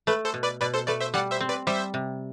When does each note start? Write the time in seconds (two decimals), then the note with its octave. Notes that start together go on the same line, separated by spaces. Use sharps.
0.07 A3 B4
0.25 A4 C5
0.34 B2
0.43 B4 D5
0.61 B2 B4 D5
0.74 A4 C5
0.87 A3 B4 D5
1.01 C5 E5
1.14 G3 D5 F#5
1.31 C5 E5
1.41 C4
1.49 B4 D5
1.67 G3 C5 E5
1.94 C3